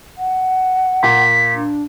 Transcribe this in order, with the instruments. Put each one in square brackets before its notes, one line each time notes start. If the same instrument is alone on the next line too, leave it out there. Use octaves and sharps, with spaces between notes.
[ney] F#5
[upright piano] A#2 [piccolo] B6
[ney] D4